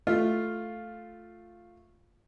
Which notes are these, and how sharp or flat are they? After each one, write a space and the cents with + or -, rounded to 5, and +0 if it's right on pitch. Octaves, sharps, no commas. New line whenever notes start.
A3 +0 F4 +0